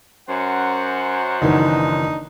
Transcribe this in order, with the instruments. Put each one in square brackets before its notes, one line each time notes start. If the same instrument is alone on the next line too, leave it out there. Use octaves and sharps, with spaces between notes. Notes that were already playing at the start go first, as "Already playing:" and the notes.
[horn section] F#2 C5 F#5
[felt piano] F#1 D#3 E3 [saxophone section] D4 D#4